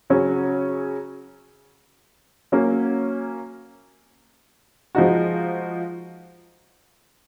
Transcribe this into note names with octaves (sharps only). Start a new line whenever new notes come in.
C#3 F#3 C#4
F#3 A#3 C#4
F3 G#3 D#4 F#4